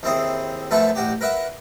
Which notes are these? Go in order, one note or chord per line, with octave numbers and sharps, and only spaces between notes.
D#2 C4 E4 G#4
F#2 F3 A3 B4 E5 C#6
A1 F#4 G4
A#4 B4 E5 F#5